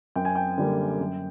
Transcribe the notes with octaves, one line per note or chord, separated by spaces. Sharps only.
F#2 G5
G#5
G5
D3 G3 A#3
F#2